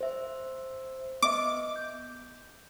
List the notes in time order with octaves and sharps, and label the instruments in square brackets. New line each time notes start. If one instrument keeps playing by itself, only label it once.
[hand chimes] C5 E5
[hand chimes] B3 D#5 E5 [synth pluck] D6
[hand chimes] G6